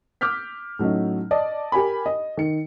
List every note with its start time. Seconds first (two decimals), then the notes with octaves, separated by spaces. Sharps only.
0.21 D6 E6 F6 G6 B6
0.79 A2 F#3 C#4 D#4
1.31 D5 D#5 A5
1.72 G4 A#4 G#5 B5
2.06 D#5
2.37 D#3 C#7